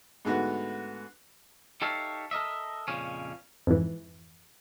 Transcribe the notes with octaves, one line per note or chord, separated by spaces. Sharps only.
G#2 D3 A3 B3 F#4
D#4 G4 A4 C#5 E5 F5
A4 A#4 D#5 E5
F2 A#2 C#3 C#4
F2 G#2 E3